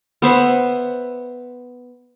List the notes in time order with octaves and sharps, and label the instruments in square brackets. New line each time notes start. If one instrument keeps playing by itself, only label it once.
[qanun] B3 C5 E5 F#5